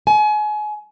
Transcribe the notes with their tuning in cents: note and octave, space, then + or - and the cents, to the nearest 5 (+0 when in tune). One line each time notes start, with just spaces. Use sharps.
G#5 +30